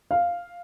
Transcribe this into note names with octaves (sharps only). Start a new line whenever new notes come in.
F5